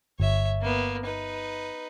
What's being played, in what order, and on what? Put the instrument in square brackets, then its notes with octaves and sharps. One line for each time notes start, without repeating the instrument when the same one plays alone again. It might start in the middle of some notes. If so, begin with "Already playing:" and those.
[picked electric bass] G1 [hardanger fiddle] C#5 E5
[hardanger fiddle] A#3 B3
D#4 B4